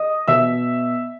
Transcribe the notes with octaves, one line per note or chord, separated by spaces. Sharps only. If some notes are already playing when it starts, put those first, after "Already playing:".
Already playing: D#5 D#6
B2 E5 E6